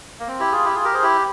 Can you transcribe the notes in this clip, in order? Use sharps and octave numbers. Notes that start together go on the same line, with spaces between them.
A#3
C4
E4 G4
F4 G#4
E4 G4
F4 G#4
G4 A#4
G#4 C5
E4 G4